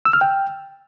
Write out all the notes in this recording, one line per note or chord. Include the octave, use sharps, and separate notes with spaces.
E6
F6
G5